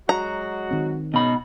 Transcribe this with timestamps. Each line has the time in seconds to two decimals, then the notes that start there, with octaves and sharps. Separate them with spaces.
0.09 F#3 G#3 F#4 A#5
0.71 D#3 C4
1.14 G#2 B2 C#4 D#4 B5